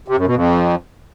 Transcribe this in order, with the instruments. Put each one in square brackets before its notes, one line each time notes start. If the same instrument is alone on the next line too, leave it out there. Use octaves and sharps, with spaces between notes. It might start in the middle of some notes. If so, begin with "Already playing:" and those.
[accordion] C3
F#2
B2
F2